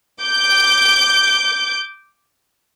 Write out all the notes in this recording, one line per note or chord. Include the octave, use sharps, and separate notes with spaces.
D6 G6